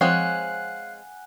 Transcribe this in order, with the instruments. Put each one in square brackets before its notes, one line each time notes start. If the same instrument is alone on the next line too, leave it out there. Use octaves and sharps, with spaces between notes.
[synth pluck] F3 [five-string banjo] G#3 C4 C#5 [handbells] F5 F#6 [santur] F#5 G#5